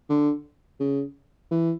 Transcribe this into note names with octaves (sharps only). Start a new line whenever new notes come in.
D3
C#3
E3